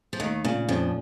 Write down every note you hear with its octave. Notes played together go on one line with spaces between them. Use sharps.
F3
D#2 D#3 A3
A#2 C#3
F2 F3 C#4